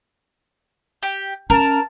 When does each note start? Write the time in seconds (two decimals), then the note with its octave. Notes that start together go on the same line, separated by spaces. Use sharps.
1.03 G4
1.50 C#4 A#4 A5